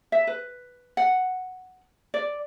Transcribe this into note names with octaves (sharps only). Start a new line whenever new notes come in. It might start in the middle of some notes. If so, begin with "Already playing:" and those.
E5
B4
F#5
D5